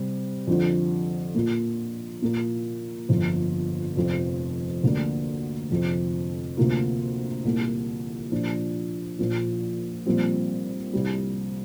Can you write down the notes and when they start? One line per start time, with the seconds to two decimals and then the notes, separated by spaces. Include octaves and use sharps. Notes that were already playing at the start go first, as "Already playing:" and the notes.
Already playing: C3 G3 C4
0.47 F2 D3 F3
1.35 A#2 A#3 F4
2.22 A#2 A#3 F4
3.09 G1 F2 F3
3.96 F1 F2 F3 C4 F4
4.84 D2 D3 A#3 D4
5.70 F1 F2 F3 C4
6.57 D2 C3 A#3 F4
7.44 C2 A#2 A#3
8.32 A#2 F3 D4
9.19 A#1 A#2 F3
10.06 A#1 A#2 G3 C4 F4
10.93 C2 C3 G3